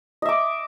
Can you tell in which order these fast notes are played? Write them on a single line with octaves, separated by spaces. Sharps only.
D#5 E5 D6